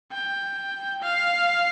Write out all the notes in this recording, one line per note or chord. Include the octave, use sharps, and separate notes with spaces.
G5
F5